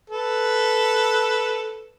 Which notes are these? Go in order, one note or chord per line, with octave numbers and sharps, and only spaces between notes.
A4 B4